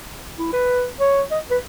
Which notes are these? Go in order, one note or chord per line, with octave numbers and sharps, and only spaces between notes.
E4
B4
C#5
D#5
B4